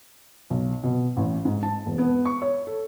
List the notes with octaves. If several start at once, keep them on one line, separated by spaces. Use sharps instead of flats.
B1
B2
A1
G#2
A5
E1
B3
C#6
C#5
A4